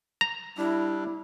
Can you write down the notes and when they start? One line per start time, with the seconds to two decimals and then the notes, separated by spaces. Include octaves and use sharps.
0.21 A#5
0.58 G3 D4 E4